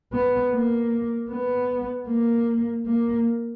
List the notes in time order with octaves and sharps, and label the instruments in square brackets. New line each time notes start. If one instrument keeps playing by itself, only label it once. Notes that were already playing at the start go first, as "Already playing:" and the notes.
[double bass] B3
A#3
B3
A#3
A#3